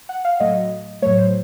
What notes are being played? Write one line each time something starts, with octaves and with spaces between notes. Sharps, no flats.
F#5
F5
A2 F#3 A3 D#5
A2 F#3 A3 C#5
C5